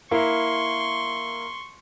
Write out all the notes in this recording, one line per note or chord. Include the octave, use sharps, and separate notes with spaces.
A#3 E4 A#4 C6 C#6